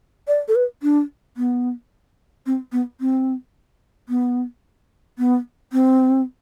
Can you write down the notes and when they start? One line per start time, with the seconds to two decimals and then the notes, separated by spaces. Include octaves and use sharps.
0.28 D5
0.48 A4
0.55 B4
0.83 D4
1.37 B3
2.46 C4
2.72 B3
3.01 C4
4.09 B3
5.18 B3
5.73 C4